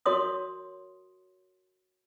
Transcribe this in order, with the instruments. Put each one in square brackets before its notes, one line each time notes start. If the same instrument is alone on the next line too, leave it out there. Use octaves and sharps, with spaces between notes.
[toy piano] F#4 A#4 C#5 C6 D#6